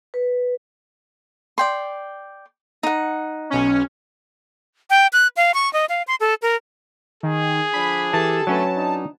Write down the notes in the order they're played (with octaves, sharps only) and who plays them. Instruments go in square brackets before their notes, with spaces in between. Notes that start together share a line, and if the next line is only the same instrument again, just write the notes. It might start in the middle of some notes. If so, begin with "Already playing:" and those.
[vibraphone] B4
[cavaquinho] D5 G5 C6
D#4 F#5
[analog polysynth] B1 C#4
[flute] G5
F#6
F5
C#6
D#5
F5
C6
A4
A#4
[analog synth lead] D#3 [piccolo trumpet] G#4
[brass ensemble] D3 F3 D4 [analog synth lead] B5
[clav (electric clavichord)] E3 [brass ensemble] G4 A4 [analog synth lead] A5
[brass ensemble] D3 A3 [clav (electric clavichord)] F#3 C#4 B4
[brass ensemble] D4 D#4